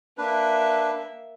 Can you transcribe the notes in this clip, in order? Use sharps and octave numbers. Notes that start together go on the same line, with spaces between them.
A#3 D4 B4 E5